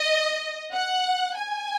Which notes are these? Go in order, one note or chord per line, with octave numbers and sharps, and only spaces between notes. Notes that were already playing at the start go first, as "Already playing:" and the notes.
Already playing: D#5
F#5
G#5